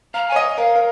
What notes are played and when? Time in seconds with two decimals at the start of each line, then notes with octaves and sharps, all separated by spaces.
0.14 F5 A#5
0.28 C#5 G#5
0.36 D#5
0.58 A#4 F5
0.76 A#4